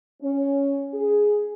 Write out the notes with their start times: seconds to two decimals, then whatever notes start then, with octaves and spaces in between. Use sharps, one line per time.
0.22 C#4
0.94 G#4